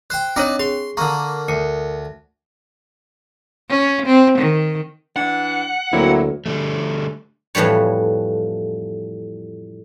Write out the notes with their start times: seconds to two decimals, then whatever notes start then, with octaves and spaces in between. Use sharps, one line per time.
0.10 C5 G5 F#6
0.36 C4 D4 D#4 C#5 D5 A#5
0.59 G#4 C6
0.97 D3 A#3 A#5 C#6
1.48 D2 A#4 C#7
3.70 C#4
4.06 C4
4.39 D#3
5.16 E3 D4 F#5
5.93 D2 F#3 A#3 C4 E4
6.46 D3 G3 A3
7.55 F2 A2 E3 G3 C#5